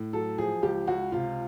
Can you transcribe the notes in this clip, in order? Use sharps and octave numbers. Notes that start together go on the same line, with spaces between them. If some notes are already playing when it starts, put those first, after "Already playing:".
Already playing: A2
F#3 A4
F3 G#4
C#2 G4
C#2 F#4
C3 F4